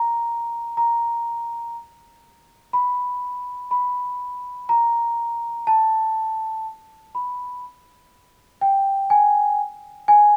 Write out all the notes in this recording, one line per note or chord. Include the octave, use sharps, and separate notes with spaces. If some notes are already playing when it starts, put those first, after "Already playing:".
Already playing: A#5
A#5
B5
B5
A#5
A5
B5
G5
G#5
G#5